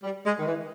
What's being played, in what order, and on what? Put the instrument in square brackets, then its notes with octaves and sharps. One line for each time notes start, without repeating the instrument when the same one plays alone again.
[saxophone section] G3
G#3
D#3
E3